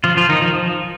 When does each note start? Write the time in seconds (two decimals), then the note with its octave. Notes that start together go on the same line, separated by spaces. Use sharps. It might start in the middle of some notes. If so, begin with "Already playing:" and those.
0.04 F3 F4
0.17 F3 F4
0.29 D#3 D#4
0.42 F3
0.55 F3